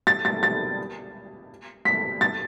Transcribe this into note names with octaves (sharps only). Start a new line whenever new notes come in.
A6
A6
A6
B6
A6